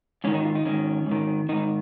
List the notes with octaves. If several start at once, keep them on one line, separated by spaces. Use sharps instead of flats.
G#2 D#3 C#4
D#4
F4
D#4
G#2 D#3 C#4
G#2
D#3
G#2 D#3 D#4